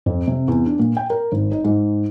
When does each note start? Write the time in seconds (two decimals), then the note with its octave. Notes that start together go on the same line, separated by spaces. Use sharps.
0.06 F2
0.27 C3
0.48 E2
0.66 D4
0.79 A#2
0.97 G5
1.10 A#4
1.32 G#1
1.52 D#4
1.64 G#2